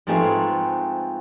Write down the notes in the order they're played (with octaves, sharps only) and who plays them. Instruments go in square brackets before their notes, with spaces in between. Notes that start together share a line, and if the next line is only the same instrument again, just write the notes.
[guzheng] G#2 F3 A3 C4 G#4 B4